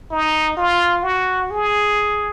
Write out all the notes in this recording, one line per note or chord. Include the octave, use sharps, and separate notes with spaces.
D#4
F4
F#4
G#4